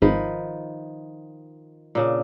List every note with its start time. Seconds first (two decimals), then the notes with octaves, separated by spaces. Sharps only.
0.02 G#1 D#3 F3 B4
1.95 A#2 C#3 D4